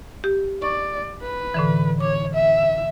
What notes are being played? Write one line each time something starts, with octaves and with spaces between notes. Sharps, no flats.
G4
D5 C#6
B4
A2 D3 E3
C#5 D6
E5